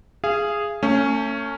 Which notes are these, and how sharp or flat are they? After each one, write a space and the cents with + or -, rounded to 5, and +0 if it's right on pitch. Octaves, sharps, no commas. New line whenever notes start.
G#4 -5 F5 -30
A3 +35 C#4 +0